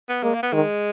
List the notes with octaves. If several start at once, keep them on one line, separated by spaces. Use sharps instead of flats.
B3
G#3 A#3
A#3
B3
D#3 G#3